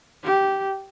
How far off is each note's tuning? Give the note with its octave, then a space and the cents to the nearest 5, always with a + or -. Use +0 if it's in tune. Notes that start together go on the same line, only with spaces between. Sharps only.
G4 -10